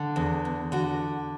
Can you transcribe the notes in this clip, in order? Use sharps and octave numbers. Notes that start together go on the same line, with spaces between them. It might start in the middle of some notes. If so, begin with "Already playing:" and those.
Already playing: D3
E2
E2
D3 F#4